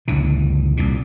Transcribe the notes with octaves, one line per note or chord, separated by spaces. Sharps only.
F#1 C#2 D3 E3
C2 A#2